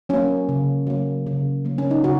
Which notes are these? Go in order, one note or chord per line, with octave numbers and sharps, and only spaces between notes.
F#3 A#3 C#4
C#3
F#3 A#3
C#3
F#3 A#3
C#4
D#4
C#3 F#4